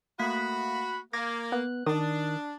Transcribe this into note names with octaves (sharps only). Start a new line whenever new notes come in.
A3 A#3 F#4 B5 B6
A#3 D6 G#6 A#6
B3 F#6
D#3 D4 D#6